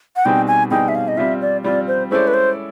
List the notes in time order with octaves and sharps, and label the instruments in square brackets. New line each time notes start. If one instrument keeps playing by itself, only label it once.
[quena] F#5
[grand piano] B2 G3 C4 D#4 G#4 [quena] G5
[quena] G#5
[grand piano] B2 G3 C4 D#4 G#4 [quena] G5
[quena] E5
F5
D#5
[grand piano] G3 C4 F4 [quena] E5
[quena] D5
[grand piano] G3 C4 F4 [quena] D5
[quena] C5
[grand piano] G#3 C#4 E4 A4 D5 [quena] C5
[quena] B4
C5